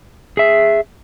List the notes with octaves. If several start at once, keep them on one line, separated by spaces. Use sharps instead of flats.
G#4 E5